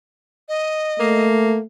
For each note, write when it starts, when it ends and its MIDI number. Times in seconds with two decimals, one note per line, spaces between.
0.48 1.25 75
0.99 1.62 57
0.99 1.59 58